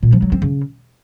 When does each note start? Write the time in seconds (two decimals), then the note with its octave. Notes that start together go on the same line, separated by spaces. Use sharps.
0.03 A#2
0.12 F3
0.22 F#3
0.32 C4
0.42 C#3